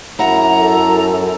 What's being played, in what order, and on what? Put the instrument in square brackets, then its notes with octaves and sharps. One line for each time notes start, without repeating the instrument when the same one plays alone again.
[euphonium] F#2 [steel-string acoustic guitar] E4 F#5 [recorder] A#5
[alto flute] A4